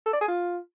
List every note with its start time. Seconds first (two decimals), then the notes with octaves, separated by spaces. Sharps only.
0.06 A4
0.13 D5
0.21 G#4
0.28 F4